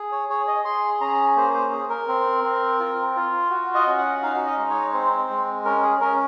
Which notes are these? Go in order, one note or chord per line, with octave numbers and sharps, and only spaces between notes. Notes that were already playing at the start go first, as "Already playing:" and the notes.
Already playing: G#4
C#5
G#4 C#5
D#5
G#4 C6
C#4 A#5
A#3 C5
C5
G#4
A#4
C4
C4
F4
F4
F#4
D#5
C#4
F#5
D#4 F5
D#5
G#3
C#5
C4 C5
G#3
C#4 A#4
G#4
C#4 A#4